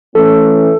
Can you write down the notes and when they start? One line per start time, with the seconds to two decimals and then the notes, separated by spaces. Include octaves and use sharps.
0.15 E3 A3 C#4 A4